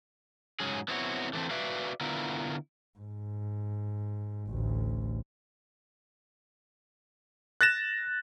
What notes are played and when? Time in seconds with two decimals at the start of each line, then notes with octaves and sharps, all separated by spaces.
0.60 G#2 F#3 C#4 G#4
0.88 B3 C4 E4 F#4 C#5
1.33 D3 E3 A3 C4
1.50 F#4 B4 D5 E5 F5
2.01 D3 B3 E4 F4 A#4
3.00 G#2
4.49 A1 D2
7.61 F#6 A6 A#6 E7